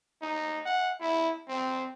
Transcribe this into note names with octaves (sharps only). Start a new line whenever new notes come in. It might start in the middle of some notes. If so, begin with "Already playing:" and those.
D#4
F#5
E4
C4